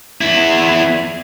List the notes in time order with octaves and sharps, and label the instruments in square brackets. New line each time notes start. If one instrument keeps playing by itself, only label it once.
[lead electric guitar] E2 E4